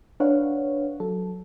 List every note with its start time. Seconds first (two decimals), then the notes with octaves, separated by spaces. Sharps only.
0.20 D4 B4 C#5 F5 F#5
1.00 F#3 A4